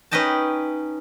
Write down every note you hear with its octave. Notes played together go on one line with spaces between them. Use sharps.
C#4 D#4 B4 D#5 G5 A5